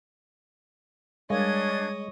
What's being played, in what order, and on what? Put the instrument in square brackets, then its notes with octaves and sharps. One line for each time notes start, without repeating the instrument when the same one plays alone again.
[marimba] G3 A#4 F5 [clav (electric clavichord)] G#3 [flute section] D4 G#6 [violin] C#5 D#5